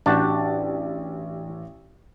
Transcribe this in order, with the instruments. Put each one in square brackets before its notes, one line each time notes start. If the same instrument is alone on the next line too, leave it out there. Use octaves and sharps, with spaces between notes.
[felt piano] A1 D5 A6 [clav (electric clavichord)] D4 F#4 G4